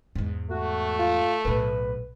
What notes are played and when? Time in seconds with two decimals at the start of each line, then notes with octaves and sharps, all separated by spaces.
0.15 E2 G#2
0.50 A3 F#4
0.99 F4
1.45 B1 A2 B4